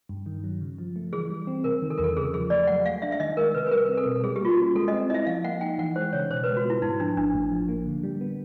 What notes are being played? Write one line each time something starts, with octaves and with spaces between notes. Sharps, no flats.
G2
D#3
F#3
C#3
F3
A3
E3 G#4
G3
C4
C3 A#4
D#3
A4
E2 A#4
A4
C#3 G#4
F3 G#4
A3 D5
F#3 F#5
A3 F5
D4 E5
E5
D#3 D#5
G#3 A#4
C3 B4
B4
G3 A#4
C4
A4
B2
G3 G#4
G4
A#3 F4
F#4
C#4
G#3 A4
D#5
C4
E4 D#5 E5
F3 F5
A#3 F#5
D#4 G5
E3 F#5
G#3 C5
C#3 C#5
B2 C5
G#3 B4
F#4
B3 E4
G#2 D#4
F3 D4
G#1 D4
A2
F3
A#3
D3
G3
B3